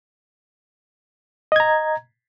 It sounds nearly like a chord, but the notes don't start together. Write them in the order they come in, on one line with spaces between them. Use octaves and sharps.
D#5 G#6 A#5